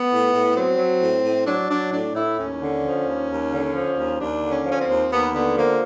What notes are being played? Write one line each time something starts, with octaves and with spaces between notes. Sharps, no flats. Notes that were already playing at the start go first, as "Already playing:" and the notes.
Already playing: B3
A2
A2
F#3 C4
F#3
A2
A2
F#3 D4
F#3 D4
A2 D4
A2 E4
D#2 C#4
D3
F3
D#2
D#2
D3
F3
D#2
D#2 D4
D3
C#4
F3 C#4
C4
D#2
D#2 B3
D3 B3
F3 A#3